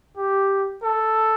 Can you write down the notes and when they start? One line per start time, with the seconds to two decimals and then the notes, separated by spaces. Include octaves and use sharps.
0.17 G4
0.83 A4